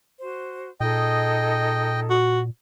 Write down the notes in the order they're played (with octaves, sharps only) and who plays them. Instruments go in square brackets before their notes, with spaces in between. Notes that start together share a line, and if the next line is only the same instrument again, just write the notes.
[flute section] F#4 C5
[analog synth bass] A#2 [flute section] D#4 G#4 A4 [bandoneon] D#5 G5
[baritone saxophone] F#4